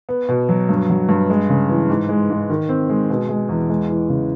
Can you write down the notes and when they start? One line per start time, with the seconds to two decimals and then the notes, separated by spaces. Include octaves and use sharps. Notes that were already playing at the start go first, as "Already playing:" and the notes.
0.09 B3
0.29 B2
0.49 F#3
0.69 G2
0.90 F#3
1.09 G2
1.30 G#3
1.50 C#3
1.69 E3
1.90 G#2
2.09 G#3
2.30 G#2
2.50 D#3
2.69 C4
2.90 G#3
3.10 B2
3.29 G#3
3.49 E2
3.70 G#3
3.89 E3
4.09 C#3